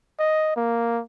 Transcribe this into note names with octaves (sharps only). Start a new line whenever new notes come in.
D#5
A#3